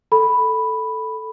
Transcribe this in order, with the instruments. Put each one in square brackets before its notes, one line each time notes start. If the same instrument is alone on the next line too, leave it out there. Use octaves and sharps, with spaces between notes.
[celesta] A4 B5